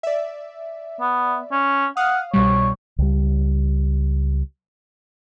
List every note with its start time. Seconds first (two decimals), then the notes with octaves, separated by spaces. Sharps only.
0.03 D5 E5
1.01 B3
1.52 C#4
1.97 F5 F#5 D#6 F6
2.34 C2 B2 G3 C#5
2.99 C#2 G3